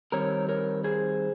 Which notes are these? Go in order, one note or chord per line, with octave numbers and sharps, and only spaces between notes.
D#3 G3 C4 A#4 C#5
A#4 C#5
G#4 C5